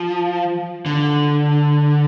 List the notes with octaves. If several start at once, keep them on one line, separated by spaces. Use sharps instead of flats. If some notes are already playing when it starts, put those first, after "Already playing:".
Already playing: F3
D3